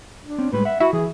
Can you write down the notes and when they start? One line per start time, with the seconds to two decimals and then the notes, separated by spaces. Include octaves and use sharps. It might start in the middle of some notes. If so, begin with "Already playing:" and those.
0.25 D4
0.38 C4 C#4
0.53 A2 G3 G#3 B4
0.65 E5 F#5
0.80 E4 F#4
0.93 E3 G#4